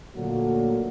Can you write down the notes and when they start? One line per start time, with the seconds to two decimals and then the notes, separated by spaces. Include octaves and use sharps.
0.16 A#2 D3 F#3 A3 A#3 F#4